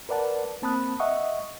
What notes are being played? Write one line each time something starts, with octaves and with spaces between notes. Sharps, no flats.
A#4 B4 D5 F#5 A5
A#3 C4 A5 B5 D#6 F#6
D#5 E5 F#5 C#6 D#6